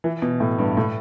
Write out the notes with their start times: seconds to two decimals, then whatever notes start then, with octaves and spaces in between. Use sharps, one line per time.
0.04 E3
0.22 B2
0.40 A2
0.59 G2
0.77 A2